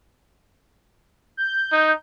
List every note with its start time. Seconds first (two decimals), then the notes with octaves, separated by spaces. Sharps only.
1.37 G6
1.72 D#4